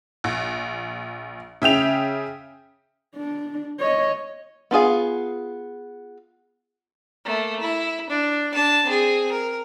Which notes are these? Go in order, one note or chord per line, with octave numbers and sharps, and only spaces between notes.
A#1
C#3 E5 G5 F7
D4
C#5 D#5
B3 F4 G#4 F5
A3 A#3
E4
D4
D4 A5
C4 G#4
A#4